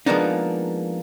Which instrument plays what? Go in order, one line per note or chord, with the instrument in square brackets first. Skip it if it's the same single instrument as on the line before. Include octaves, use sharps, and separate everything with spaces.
[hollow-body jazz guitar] F3 G#3 A#3 B3 D4 D#4